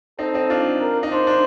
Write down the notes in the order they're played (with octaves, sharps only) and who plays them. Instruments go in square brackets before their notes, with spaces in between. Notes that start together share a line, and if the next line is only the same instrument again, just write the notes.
[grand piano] C4 D#4 [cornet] A4
[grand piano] C4 D#4
D4 F4
[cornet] A#4
[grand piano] D#4
[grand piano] D4 [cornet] C5
[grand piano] D4